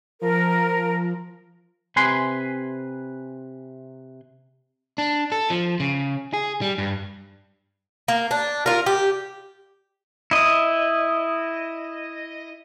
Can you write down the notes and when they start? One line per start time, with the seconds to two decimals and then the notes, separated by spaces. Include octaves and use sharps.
0.21 F3 A#4
1.96 C3 B4 G#5 C6
4.98 D4
5.32 A4
5.50 F3
5.80 C#3
6.33 G#4
6.62 G3
6.78 G2
8.08 A#3
8.31 D4
8.66 F4 A#4
8.86 G4
10.31 E4 D#5